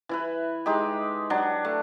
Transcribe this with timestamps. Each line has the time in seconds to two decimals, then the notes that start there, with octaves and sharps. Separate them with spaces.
0.09 E3 E4 B4
0.66 G#3 D#4 G4
1.30 F#3 D4
1.65 A3